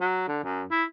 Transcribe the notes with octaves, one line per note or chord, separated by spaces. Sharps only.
F#3
D3
F#2
E4